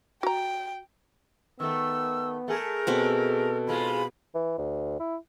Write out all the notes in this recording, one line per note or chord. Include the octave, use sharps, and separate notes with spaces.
F#4 G5 A#5
D#3 A3 B3 E6
A3 G#4 A#4
B2 C4 A4 F#5
G#2 G#3 F4 B5
E3
D2
E4